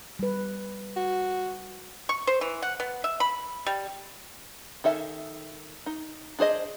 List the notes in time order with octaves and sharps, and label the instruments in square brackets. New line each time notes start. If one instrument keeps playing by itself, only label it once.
[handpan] G3 B4
[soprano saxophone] F#4
[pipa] C#6
C5
E3
F#5
B3
E5
B5
G3
[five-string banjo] D#3 A4 E5 G#5
D#4
D4 G#4 C5 D#5